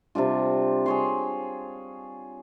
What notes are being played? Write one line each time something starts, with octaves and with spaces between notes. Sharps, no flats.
C3 G3 D4 F4
G#4 C#5 C6